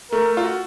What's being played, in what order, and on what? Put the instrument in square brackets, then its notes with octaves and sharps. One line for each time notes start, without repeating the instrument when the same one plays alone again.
[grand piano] A3 [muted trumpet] A#4
[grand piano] F4
F#4